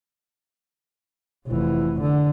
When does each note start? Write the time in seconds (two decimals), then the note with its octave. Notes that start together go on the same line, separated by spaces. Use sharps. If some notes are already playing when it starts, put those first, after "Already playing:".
1.48 F1 E3
2.01 D3